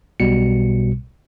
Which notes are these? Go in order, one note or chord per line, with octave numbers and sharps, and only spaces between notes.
B1 B2 G3 C#7